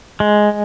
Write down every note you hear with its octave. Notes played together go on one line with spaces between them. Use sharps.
G#3